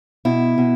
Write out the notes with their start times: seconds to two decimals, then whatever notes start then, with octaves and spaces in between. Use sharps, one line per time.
0.25 B2 E4
0.58 B2